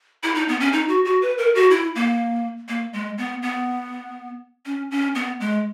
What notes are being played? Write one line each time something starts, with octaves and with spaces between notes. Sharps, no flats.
E4
D#4
B3
C#4
D#4
F#4
F#4
B4
A#4
F#4
E4
A#3
A#3
G#3
B3
B3
C#4
C#4
B3
G#3